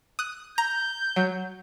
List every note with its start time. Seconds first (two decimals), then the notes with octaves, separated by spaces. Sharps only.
0.19 D#6 F#6
0.58 A#5 G6
1.16 F#3